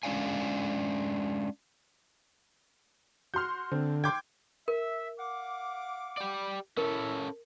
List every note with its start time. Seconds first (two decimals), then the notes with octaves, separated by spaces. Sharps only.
0.03 G#3 C#4 D4 F5 G#5
3.34 F#4 C6 F6 G6
3.72 D3 C4
4.04 G5 C6 D6 G6 G#6
4.68 A#4 E5
5.18 F5 F#5 D6
6.17 G4 D5
6.77 C#4 E4 A4 A#4